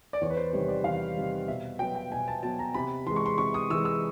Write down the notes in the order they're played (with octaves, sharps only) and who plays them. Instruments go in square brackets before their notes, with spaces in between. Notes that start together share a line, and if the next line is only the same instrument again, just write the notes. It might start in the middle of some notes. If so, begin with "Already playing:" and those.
[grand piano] D5
E2 C#5
B4
C5
C3 D#3 G3 C#5
D5
E2 F5
C3 D#3 G3
B2 E5
F#3 B3 G5
G5
B2 G#5
A5
F#3 B3 A5
A#5
C3 B5
E3 G#3 C6
C#6
C6
C3 C#6
D#6
E3 G#3 E6
E6